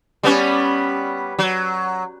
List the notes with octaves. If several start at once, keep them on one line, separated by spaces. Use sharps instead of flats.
G3 B3 C#4
F#3